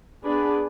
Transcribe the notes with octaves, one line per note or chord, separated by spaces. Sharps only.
B3 D4 G#4 B4 D5